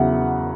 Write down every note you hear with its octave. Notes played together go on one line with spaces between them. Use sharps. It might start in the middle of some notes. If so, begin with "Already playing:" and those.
Already playing: E2 C#3 F#3 E5 F#5